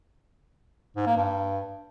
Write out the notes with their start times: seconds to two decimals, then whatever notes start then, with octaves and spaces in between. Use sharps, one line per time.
0.96 G#2
1.06 A#3
1.17 G2